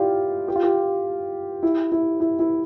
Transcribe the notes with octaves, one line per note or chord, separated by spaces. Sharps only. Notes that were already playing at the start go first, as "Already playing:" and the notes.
Already playing: E4 F4 G4 D5
G4
F4
G4
E4
E4
E4
E4